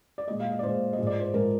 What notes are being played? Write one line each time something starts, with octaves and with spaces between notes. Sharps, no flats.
D5
A#2 G#3 D#5
F5
D#5
D5
A#2 G#3 C5
D#5
G#2 F3 G#3
D5
C5
G#2 F3 G#3 A#4